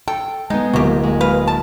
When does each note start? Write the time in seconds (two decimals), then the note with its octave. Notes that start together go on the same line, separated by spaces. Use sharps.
0.08 A4 G5
0.50 G#3 B3 D#4
0.73 D1 A#3 F#4 G4
1.04 G#3
1.21 B4 F5
1.47 A5